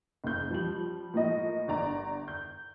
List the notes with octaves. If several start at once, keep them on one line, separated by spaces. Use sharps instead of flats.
F#1 G6
F3 G3 F#7
A2 F3 A#3 A#4 D#5
G1 D5 A#5
G6